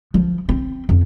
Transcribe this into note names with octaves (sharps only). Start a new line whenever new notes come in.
F3
C4
F2